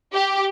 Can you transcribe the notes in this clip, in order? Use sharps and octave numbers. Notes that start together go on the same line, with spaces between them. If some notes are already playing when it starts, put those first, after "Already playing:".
G4